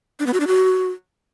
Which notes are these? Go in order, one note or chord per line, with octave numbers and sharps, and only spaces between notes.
D4
B3
F#4
D4
F#4